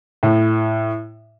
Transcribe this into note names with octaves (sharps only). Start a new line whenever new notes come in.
A2